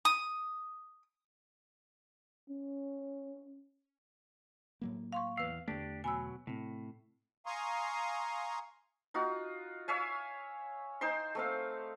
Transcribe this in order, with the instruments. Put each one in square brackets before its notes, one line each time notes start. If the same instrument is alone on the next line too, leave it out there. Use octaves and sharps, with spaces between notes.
[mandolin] D#6
[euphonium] C#4
[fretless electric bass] A2 F#3 A#3
[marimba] F5 C6 C#6
[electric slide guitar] E2 F5 [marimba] B4 E6
[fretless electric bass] E2 D3 A3 [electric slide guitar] D4 G4
[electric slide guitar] B2 F#3 [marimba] G#5 B5 E6
[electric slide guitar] A2 [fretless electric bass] C3 C4
[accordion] F5 G#5 A#5 C6 C#6 D#6
[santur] D#4 F4 F#4
C#5 E5 F5 G#5
D#4 C5 G5 C6
A3 C4 F5